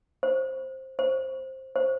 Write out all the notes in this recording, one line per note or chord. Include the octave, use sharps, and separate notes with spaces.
C5
C5
C5